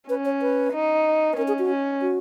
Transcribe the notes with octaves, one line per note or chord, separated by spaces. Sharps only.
C#4 B4
C#5
B4
D#4
B4
C#4 A#4
G#4
F#4
C#4
F#4